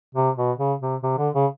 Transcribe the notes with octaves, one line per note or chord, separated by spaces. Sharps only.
C3
B2
C#3
C3
C3
D3
C#3